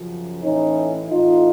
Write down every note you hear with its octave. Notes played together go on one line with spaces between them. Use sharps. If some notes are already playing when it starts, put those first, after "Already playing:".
Already playing: F#2 C#3 F3
A2 E3 C#4 D#4
A2 E3 D#4 F4